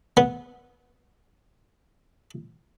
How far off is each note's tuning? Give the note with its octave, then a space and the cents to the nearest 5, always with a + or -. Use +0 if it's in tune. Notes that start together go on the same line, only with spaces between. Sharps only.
B3 -10